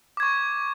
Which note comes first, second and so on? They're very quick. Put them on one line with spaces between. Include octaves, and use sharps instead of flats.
D6 G#6 C#6